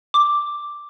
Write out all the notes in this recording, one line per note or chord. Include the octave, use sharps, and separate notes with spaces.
D6